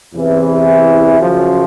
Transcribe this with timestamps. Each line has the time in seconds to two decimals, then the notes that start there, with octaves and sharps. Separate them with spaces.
0.14 E2 C3 E3
1.18 F#2 C#3 F3